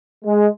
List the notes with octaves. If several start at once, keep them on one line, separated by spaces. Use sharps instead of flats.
G#3